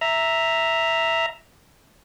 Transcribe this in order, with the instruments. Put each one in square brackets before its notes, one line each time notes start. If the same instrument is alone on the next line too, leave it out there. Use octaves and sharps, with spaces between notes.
[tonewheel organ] E5 A#5